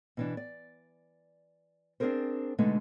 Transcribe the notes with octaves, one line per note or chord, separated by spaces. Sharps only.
B2 E3 D4
D5
C4 D4 D#4 G#4 A#4 C5
B2 D3 G#3 A3 B3 D#4